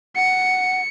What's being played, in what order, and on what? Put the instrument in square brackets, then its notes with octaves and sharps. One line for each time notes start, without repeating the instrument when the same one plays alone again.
[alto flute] F#5 [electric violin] C#7